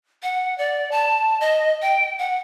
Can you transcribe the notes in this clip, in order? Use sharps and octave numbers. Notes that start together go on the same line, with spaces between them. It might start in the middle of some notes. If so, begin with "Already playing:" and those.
F#5
D5
A5
D#5
G5
F#5